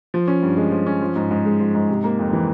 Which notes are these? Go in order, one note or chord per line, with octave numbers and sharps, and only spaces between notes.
F3
C#4
G2
G#3
F3
C#4
F3
G#2
G#2
G#3
F3
G#2
C3
A#3
F2
E3